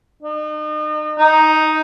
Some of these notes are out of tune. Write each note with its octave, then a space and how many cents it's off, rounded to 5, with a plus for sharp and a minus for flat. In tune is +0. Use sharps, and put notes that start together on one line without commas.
D#4 -40
D#4 +5